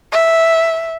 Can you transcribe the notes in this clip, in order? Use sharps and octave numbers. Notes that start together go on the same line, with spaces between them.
E5